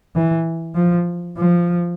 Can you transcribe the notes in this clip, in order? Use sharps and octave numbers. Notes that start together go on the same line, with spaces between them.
E3
F3
F3